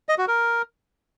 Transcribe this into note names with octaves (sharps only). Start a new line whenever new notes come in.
D#5
F#4
A#4